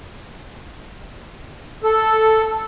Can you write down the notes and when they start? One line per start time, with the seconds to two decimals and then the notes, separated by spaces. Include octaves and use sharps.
1.84 A4